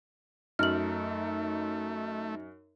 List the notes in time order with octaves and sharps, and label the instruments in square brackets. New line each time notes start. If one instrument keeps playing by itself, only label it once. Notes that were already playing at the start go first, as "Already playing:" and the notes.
[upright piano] F#2 [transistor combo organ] A3 [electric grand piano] D#4 [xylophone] F6 F#7